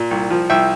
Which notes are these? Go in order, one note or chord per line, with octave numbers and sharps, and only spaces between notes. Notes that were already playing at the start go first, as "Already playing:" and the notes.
Already playing: A#2
C2
F3
C2 E5 G5